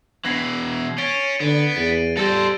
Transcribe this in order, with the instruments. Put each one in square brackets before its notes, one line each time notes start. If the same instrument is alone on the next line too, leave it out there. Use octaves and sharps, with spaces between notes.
[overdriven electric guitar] B2 E3 [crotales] G#6 A#6 C7
[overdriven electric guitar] C#4 [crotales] A6 D7 G7
[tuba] D3 [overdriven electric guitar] B3
[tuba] E2 [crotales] A6 D7 D#7
[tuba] G3 [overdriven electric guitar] A4 C5 [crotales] E6 A6 A#6